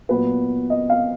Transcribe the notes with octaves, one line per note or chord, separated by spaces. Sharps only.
A#2 F#3 B3 B4
D#5
F5